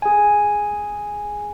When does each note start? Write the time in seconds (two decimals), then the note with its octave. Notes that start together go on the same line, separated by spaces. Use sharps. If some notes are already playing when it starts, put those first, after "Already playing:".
0.02 G#4 G#5